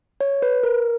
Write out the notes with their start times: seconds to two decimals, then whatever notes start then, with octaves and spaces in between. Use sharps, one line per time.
0.21 C#5
0.42 B4
0.63 A#4